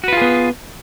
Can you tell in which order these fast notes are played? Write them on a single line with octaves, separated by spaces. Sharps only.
F#4 B4 F4 G#4 B3